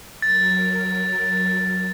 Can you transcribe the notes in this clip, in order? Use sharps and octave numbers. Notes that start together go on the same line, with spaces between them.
F#3 A#4 A6